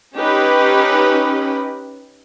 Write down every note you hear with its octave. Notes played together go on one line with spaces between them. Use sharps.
C#4 D#4 G4 B4